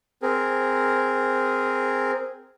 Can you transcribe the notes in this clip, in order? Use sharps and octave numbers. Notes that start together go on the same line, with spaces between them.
C4 G#4 A#4